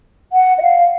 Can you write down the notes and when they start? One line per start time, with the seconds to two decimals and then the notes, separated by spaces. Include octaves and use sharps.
0.33 F#5
0.58 D#5
0.62 F5